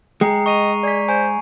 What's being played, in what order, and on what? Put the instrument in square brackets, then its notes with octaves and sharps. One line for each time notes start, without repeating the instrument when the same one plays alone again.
[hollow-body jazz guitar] G#3 [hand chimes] G5 [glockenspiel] A#5 C7 C#7
[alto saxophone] D#5 [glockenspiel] C#6 D#7 F7
[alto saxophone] G#4 [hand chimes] D5 B6
[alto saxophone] C5 [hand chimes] G#5